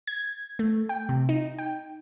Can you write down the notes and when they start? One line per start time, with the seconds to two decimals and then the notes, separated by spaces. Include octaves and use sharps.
0.07 G#6
0.59 A3
0.89 G5
1.09 C3
1.29 D#4
1.59 G5